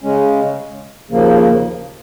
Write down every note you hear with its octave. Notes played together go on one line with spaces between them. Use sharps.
C#3 G#3 C#4
D#2 C#3 F3 A#3